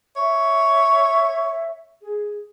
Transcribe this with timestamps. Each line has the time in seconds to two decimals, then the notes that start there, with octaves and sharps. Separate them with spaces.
0.16 C#5 E5
2.02 G#4